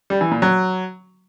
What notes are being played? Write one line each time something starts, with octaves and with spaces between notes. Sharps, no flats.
G3
E3
A#2
F#3